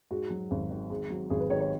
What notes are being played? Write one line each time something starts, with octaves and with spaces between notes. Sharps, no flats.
G#2 F#4
F#3
G#1
D#3
G#2
F#3
G#1 G#4
B4
D#3 C#5
C#5